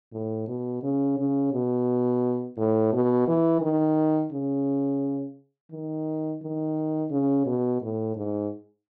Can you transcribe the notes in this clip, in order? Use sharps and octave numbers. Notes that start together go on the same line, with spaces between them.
A2
B2
C#3
C#3
B2
A2
B2
E3
D#3
C#3
D#3
D#3
C#3
B2
A2
G#2